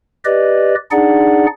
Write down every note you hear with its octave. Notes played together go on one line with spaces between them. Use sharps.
G4 B4 D5 D#5
D4 D#4 G#4 D5 F#5